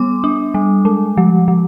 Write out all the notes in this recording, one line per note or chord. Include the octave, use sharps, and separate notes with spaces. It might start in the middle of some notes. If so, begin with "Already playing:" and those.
Already playing: G3 B3 D6
D4
G3
G#3
F3
F3